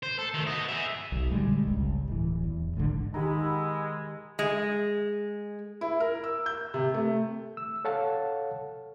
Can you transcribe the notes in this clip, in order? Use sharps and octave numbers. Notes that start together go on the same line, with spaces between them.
C5
A4
D#3 A3
B3 D#5
G#4 E5
B1
A#2 D3 G3 G#3
G1 C#2
D1 E3
E2
F1 B1 G#2 D3
D#3 G#3 G4 F#5 A#5 B5 E6
G#3
E4
A#4
E6
G6
C3
A3
E6
A4 C#5 F5 F#5 A5